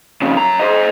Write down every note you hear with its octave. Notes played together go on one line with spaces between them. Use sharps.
F2 C#3
F#2 A#5
C5 D#5